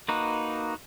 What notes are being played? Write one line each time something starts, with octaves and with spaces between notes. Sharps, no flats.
A#3 D#4 F#4 B4